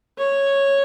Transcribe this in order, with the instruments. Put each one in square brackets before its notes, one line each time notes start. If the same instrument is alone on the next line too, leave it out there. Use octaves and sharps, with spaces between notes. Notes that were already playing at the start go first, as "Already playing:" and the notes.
[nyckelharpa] C#5